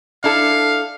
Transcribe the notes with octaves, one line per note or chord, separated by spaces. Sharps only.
D4 E4 A4 F5